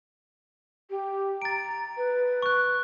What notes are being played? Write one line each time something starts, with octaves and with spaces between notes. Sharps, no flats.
G4
A#5 A6 D7
B4
C#6 F#6